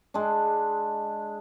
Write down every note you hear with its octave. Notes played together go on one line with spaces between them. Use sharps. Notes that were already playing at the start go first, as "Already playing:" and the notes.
G#3 D4